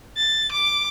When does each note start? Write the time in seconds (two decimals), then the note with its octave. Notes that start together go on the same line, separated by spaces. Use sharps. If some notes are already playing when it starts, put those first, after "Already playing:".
0.17 A6
0.52 D6